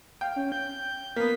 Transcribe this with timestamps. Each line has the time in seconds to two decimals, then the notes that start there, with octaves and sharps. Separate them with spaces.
0.21 F5 G5
0.36 C#4
0.52 G6
1.16 A#3 B3 B6